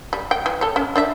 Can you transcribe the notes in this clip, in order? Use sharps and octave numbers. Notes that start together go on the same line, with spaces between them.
G3
G5
E3
A4 C#5
C#4
D4 D5 E5